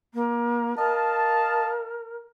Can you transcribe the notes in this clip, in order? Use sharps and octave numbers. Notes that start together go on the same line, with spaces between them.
A#3
A#4 D#5 F5 A5